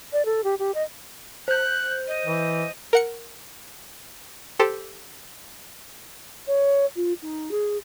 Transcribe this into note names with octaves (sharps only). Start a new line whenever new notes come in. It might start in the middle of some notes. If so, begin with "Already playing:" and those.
D5
A4
G4
G4
D#5
C5 F#6 G6
D#5
E3
A#4 F#5 C#7
G4 A4 C5
C#5
F4
D#4
G#4